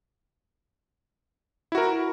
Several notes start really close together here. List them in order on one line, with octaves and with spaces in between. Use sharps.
E4 F#4 A#4